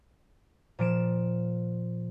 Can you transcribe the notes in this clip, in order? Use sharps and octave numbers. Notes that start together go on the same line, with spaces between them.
A#2 F3 D7 E7